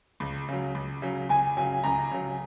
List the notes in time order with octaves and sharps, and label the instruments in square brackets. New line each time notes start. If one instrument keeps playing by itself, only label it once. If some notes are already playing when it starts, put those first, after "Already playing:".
[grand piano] C#2
C#3 F#3
C#2
C#3 F#3
[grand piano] C#2 [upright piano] G#5
[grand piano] C#3 F#3 [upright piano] G#5
[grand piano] C#2 [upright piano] A#5
[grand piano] C#3 F#3